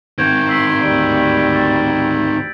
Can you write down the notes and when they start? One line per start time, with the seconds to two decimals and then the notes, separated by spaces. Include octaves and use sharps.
0.18 D#3 C4 G6 G#6 D7
0.49 C6 E6 B6 F#7
0.82 D2 G3 D7
1.53 A6